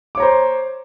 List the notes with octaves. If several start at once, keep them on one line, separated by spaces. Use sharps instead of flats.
C5 C#5 A#5 D6